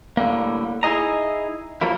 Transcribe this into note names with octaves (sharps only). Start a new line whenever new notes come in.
A2 D3 G3 A#3
D#4 E4 G4 G#4 D#5 A#5
F3 F#3 A#3 E4